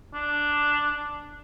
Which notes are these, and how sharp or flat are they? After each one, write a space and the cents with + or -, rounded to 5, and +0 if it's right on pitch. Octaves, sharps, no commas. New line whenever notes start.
D4 +0